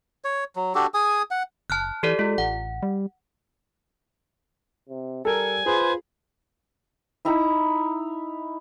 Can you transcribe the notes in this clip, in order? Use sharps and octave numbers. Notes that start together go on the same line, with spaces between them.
C#5
F#3
D4 F#4 G4 A4
G#4 G#5 D#6
F#5
F#1 A5 F6 F#6
E3 G4 A4 D5
G#3 F4
A1 F#5
G3
C3
G3 A4 A#4 G#5
F4 G#4 B4 C5
D#4 E4 A#5 B5